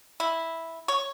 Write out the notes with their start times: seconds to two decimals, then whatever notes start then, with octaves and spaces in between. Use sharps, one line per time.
0.20 E4
0.88 C#5